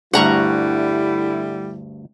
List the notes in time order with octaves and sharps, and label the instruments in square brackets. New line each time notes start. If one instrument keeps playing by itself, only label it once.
[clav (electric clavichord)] D2 G2 [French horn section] D3 E4 [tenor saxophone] G3 [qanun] F#5 A#5 C#6